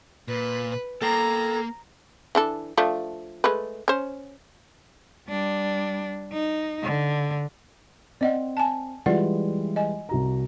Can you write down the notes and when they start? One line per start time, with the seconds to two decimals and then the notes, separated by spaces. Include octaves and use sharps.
0.28 A#2 B4
1.02 A#3 A4 G5 A#5
2.35 E3 D4 A4
2.78 F3 A3 D4
3.44 G#3 A3 B4
3.88 C#4 C5
5.28 G3 D4
6.33 D#4
6.83 D3
8.21 C4 D5 D#5 F#5
8.57 G#5 A5
9.06 E3 G3 G#3 F4 D5 F#5
9.76 D#5 G#5
10.09 C2 F#4 A#5